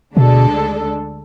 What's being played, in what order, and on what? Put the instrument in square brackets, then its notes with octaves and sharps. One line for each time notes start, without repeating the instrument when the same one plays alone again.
[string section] D2 D3 G#3 D4 A4 [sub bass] B2